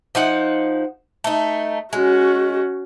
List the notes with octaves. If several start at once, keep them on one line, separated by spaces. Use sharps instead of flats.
F3 D#4 F#5
A3 D#4
G#3 C#4 F#4